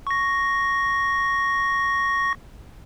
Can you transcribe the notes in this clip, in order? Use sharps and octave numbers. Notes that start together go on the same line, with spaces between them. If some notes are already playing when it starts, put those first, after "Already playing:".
C#6 A#6